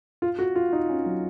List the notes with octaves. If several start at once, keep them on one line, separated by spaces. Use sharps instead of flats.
F4
F#4
F4
D#4
C#4
F#3